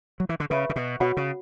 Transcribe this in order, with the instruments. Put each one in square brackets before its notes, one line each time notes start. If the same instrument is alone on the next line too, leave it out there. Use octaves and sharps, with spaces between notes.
[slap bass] F#3
E3
D3
[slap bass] C#3 [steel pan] B4 E5 B5
[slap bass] C#3
B2
[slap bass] B2 [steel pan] F#4 C#5 F#5 B5
[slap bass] C#3